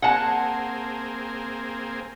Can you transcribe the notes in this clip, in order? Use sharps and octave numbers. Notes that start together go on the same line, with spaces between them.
A#3 C4 G#4 F#5 A5